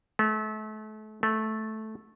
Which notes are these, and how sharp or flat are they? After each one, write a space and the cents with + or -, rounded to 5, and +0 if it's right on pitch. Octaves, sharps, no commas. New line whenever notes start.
A3 -35
A3 -10